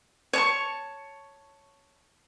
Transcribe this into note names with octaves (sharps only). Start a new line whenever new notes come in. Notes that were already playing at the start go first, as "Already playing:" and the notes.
C#5 A5 C#6